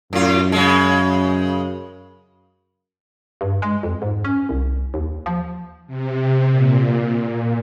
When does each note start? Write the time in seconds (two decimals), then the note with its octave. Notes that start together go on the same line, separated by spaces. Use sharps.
0.13 F#2 A2 F4
0.52 C#3 G#3
3.41 G2
3.62 G#3
3.83 F2
4.02 G#2
4.25 C#4
4.49 C2
4.94 D#2
5.26 F3
5.87 C3
6.50 A#2